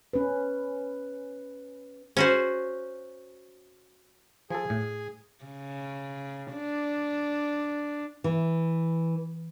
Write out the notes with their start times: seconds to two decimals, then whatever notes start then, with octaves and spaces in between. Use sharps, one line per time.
0.13 C#4 B4
2.17 C#4 F#4 C5
4.50 F3 G#4 A4 G#5
4.70 A2
5.45 C#3
6.53 D4
8.24 E3